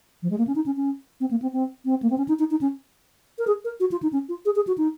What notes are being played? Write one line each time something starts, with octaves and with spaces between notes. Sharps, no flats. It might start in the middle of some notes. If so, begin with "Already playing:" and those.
F3
G#3
A#3
C#4
D#4
C#4
C#4
C4
A#3
C4
C4
C4
A#3
C4
C#4
D#4
D#4
D#4
C#4
A#4
G#4
A#4
F#4
F4
D#4
C#4
F4
G#4
G#4
F#4
D#4